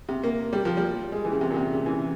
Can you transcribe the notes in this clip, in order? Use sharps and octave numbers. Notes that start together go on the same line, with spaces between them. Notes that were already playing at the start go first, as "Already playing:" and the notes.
C3
A#3
G3
F3
G3
G#3
E3
C#3
C3
A#2
C3
C#3
E3